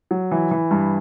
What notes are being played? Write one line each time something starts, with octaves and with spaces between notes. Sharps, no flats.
F#3
E3
E3
G2